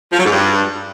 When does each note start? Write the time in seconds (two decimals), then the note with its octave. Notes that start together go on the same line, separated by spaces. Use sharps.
0.12 F3
0.19 F#3
0.25 G#2
0.32 G2